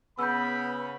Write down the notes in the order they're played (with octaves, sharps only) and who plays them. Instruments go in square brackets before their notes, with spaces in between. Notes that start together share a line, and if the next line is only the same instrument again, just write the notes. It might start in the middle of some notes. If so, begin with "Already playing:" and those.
[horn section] C#3 [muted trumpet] B3 [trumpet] B5 [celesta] E6 G6